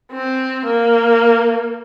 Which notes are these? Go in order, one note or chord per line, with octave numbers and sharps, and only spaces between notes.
C4
A#3